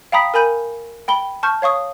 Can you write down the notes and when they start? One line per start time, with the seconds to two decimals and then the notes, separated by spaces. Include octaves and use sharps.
0.12 F5 G5 A#5 B5 D#6 B6
0.34 A#4 G#5 B5 G6 D#7
1.08 G5 B5 G7
1.43 A5 C#6 F6 G6
1.62 C#5 F5 C#6 D#6